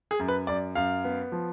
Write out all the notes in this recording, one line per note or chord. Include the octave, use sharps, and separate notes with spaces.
G#4
F#2
B4
F#2 D5
F#2 F5
B3
F3